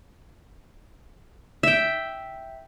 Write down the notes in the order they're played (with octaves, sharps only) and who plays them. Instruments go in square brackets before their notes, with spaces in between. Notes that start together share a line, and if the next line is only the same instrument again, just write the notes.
[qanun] E5 G5